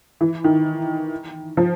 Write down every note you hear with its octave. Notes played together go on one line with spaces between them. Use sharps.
E3
D#3
F3